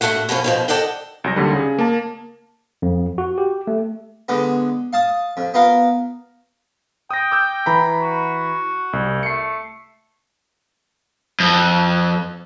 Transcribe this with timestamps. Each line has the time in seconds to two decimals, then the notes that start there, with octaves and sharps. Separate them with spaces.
0.01 A2 A3 D4 F#4 F#5
0.29 B2 D3 F3 C#4
0.44 F2 B2 F3
0.68 A4 D5 D#5 F#5 G5
1.24 C2 F#3 A#6
1.36 D#2 D3 G3
1.52 C#3 G#4
1.79 A#3 A5
2.82 F2
3.18 F#4
3.38 G4
3.67 A3
4.28 D3 G#3 B3
4.93 F5 A5 D#6
5.37 F2
5.54 B3 F4 A#4 F5
7.11 G5 D#6 A#6
7.31 D6 E6 G6
7.66 E3 A#5 B5
8.01 F#4
8.93 C2
9.23 A3 C7 C#7
11.40 F2